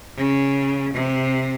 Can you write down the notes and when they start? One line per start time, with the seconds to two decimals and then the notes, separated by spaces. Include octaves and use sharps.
0.17 C#3
0.93 C3